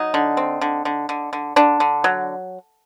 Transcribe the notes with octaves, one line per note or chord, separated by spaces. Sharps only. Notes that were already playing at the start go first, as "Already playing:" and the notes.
Already playing: F#3 D#4
D3
C4
D3
D3
D3
D3
D3 D4
D3
F#3